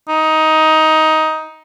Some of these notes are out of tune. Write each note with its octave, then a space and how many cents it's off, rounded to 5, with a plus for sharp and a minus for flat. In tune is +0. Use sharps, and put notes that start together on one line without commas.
D#4 +15